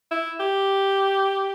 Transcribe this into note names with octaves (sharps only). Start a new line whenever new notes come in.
E4
G4